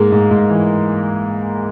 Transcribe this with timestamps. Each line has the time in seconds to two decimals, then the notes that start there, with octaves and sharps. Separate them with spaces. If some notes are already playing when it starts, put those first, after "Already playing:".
Already playing: G#2 G#3 A#3
0.12 G#2
0.31 G#2
0.50 E3